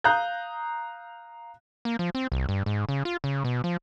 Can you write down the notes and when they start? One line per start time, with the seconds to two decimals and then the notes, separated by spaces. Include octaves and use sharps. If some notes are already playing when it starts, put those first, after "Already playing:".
0.04 F5 A#5 D#6 F#6 G6
1.85 A#3
1.99 F3
2.15 C4
2.32 C2
2.49 G2
2.66 G#2
2.89 C#3
3.05 F4
3.24 C#3
3.44 B2
3.64 F3